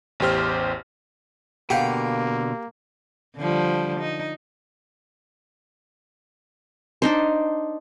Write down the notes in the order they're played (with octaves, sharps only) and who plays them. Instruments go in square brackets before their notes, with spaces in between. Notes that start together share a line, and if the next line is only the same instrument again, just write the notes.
[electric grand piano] A1 E2 G4 C5 F6
[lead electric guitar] B2 D3 [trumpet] A#3 [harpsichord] G4 [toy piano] F5 F#5
[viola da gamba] D3 F3 G3
D#4
[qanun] D4 D#4 C5